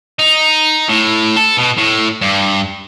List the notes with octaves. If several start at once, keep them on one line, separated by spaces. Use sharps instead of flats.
D#4
A2
A4
B2
A2
G2